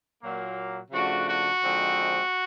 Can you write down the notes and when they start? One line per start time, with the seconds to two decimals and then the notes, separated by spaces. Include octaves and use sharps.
0.21 A#2 F#3 A#3
0.91 C#3 F3 A3 D4 F#4
1.28 F#4
1.62 D3 F3 G#3 C4 D#4